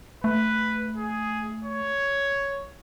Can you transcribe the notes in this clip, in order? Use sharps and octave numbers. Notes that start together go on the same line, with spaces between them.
A3 B4
G#4
C#5